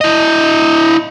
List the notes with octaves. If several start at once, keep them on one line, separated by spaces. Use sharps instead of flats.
E4 D#5